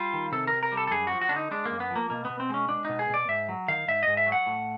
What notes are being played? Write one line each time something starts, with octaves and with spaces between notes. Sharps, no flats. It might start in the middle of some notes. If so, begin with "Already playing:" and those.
Already playing: G3 F4
D#3
C3 A4
C3 A#4
A#4
G3
A4
A4
F#2 G#4
F3 F#4
F#4
D3 D4
D#4
G#3 D4
F#2 A#3
B3
F3
A#3
B2 A#3
B2 B3
C4
G#3 C#4
G#3 D4
B2 D#4
G#4
B2 D5
G#2 E5
F#3
D#3 F5
G#2 E5
G#2 D#5
E5
F#3
F#5
A2